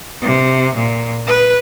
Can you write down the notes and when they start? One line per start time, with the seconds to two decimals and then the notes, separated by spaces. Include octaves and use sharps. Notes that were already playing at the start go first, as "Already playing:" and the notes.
0.22 C3
0.75 A#2
1.27 B4